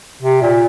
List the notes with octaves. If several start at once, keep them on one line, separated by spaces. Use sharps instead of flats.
C3
A#2